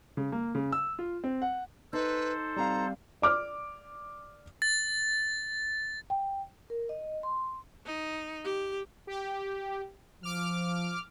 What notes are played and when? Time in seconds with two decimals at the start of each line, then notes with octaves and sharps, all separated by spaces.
0.17 C#3
0.32 A#3
0.55 C#3
0.72 E6
0.99 F4
1.24 C4
1.42 F#5
1.93 D#4 A4 B4 C5
2.57 G3 C4 F5 A#5
3.22 D5 D6 F6
4.62 A6
6.10 G5
6.70 A#4
6.89 D#5
7.23 C6
7.86 D#4
8.44 G4
9.07 G4
10.23 F3 D6 F6